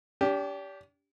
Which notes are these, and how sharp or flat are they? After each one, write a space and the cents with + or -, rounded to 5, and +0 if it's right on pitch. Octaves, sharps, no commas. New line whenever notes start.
D4 -40 G4 +0